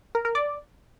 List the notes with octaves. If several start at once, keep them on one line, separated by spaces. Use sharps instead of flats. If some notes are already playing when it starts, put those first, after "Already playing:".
A#4
A#4
D5